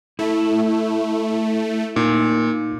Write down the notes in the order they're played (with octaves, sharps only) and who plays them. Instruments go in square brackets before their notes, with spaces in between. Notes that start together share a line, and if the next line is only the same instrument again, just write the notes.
[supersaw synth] A3 [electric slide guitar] E4
[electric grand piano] A#2 [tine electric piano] D#4